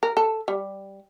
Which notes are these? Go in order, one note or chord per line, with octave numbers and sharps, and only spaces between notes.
A#4
A4
G3